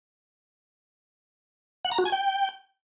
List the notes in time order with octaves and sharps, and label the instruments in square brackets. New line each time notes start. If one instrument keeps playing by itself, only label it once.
[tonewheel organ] F#5
A#5
F#4
G#5
G5